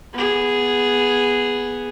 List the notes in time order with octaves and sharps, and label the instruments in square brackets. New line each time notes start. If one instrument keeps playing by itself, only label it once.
[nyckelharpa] B3 G#4